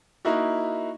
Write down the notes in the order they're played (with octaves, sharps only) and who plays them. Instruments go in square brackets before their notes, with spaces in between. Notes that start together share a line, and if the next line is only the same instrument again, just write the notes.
[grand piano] A#3 D#4 E4 F#4